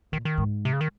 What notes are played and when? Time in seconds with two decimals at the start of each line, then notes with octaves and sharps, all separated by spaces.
0.12 A#2 D#3
0.25 D#3
0.38 G#2
0.65 C3
0.73 C#3
0.81 D#3